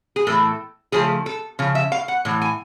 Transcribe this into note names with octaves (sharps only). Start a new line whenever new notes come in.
G#4
A2 E3 A3 A4
C#3 F3 A3 G#4
A4
C#3 F3
E5
F5
F#5
A2 E3
G#5